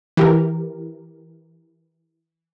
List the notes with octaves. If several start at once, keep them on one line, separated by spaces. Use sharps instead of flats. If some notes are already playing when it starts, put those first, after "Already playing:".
E3 G4 A#4